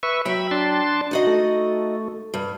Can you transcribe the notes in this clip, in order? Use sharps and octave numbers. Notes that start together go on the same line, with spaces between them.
B4 E5 C#6
F#3 E5 G5 B5
D4 A5 C6
D#4 F#4 D#5
A3
G2